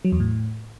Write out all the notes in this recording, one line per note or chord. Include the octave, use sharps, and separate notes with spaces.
F#3
E2
A2